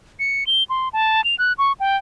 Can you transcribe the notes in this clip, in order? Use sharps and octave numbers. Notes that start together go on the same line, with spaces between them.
C#7
G7
C6
A5
F7
F#6
C#6
G5